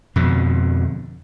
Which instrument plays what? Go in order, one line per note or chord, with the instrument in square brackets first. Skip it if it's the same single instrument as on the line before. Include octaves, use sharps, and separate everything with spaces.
[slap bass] F2 B2 D3